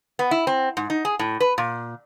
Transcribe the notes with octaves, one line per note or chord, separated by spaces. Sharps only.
B3
E4
C4
G#2
D#4
G#4
A2
B4
A#2